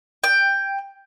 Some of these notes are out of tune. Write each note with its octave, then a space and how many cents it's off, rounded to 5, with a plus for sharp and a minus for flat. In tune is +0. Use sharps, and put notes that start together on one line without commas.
G5 +10